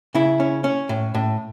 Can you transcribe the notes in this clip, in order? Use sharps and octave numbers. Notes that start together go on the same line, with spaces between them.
C#3 E4
C#4
C#4
A2
A2